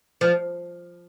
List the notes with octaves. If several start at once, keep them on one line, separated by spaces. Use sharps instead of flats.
F3